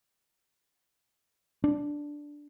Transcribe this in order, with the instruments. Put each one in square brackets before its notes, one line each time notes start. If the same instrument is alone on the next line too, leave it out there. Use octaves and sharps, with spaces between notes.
[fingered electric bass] D4